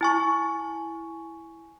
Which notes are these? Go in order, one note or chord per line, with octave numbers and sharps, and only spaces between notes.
E4 G#5 C#6